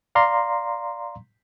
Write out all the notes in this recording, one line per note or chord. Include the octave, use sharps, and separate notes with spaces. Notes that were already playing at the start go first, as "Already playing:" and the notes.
D5 F5 A#5 C6